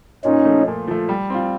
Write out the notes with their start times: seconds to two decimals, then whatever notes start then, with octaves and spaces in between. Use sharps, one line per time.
0.25 A#2 C#4 D#4
0.45 F3 A3
0.67 A#2
0.88 F3 A3
1.09 G3
1.30 C4 F4